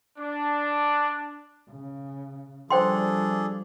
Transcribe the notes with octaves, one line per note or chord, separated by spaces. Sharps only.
D4
C#3
F3 G3 D4 G#4 A4 C5 G5 C6